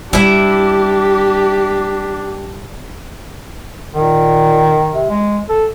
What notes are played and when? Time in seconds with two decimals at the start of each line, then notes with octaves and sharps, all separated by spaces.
0.13 G3 D4 E4 G4 E5
3.94 A#2 D#3
4.92 C3
5.10 G#3
5.49 A4